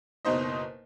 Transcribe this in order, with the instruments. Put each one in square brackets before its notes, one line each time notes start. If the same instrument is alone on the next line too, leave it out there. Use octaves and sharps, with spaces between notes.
[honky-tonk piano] F#1 B2 D#4 C5 D#5